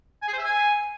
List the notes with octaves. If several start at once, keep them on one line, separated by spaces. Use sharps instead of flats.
G#5
G#4
C5
E5
G#5